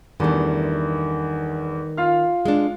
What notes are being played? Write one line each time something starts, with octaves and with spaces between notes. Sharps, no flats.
E2 G2 D#3 A3
F4 F5 F6
G#3 D4